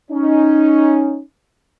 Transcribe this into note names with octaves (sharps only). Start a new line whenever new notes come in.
C#4 D#4